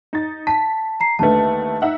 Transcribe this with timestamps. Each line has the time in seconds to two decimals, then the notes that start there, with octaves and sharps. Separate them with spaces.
0.13 D#4 A6
0.47 A5 B6
1.00 A#5 C7
1.19 D#2 D3 A3 B4 A5
1.82 D#4 E5 F#5